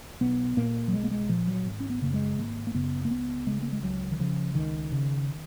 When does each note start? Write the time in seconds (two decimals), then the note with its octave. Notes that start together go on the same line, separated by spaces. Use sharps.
0.21 B1 B3
0.57 A#2 A#3
0.88 F#3
0.93 B1 G#3
1.03 A#3
1.11 G#3
1.29 A#2 F3
1.48 F#3
1.66 G#1
1.80 C#4
1.90 B3
2.02 F#2 C#3 A#3
2.14 G#3
2.38 G#1 A#3
2.67 A#3
2.74 F#2 C#3 B3
3.05 A#3
3.10 C#2 B3
3.47 C#3 G#3
3.62 A#3
3.72 G#3
3.83 C#2 F#3
4.11 D#3
4.19 C#3 F3
4.55 C#2 D#3
4.92 C#3